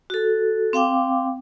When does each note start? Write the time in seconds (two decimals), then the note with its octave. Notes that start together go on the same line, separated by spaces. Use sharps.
0.10 F#4 A4
0.73 C4 F5 G5 D6